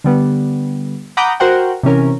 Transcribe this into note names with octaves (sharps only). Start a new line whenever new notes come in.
D3 G3 B3
F#5 A#5 B5 D6 D#6 G6
F#4 A#4 C5 F#5 G5
C3 E3 C#4 A#4